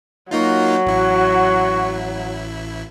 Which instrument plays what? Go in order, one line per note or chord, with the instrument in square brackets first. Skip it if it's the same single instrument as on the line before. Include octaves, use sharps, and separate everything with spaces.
[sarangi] F#3 [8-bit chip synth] A#3 D#4 F4 [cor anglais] F#4
[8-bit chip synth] A1 E4